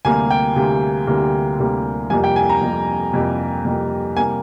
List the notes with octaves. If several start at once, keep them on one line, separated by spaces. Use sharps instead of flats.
D2 C3 G3 A#3 G#5
G5
D2 C3 G3 A#3
D2 C3 G3 A#3
D2 C3 G3 A#3
F2 C3 G3 A#3 G#5
G5
G#5
A#5
F2 C3 G3 A#3
F2 C3 G3 A#3
F2 C3 G3 A#3
C3 G3 A#3 G#5